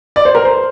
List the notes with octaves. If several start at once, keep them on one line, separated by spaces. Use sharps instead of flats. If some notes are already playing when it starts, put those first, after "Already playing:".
D5
C5
A#4
C5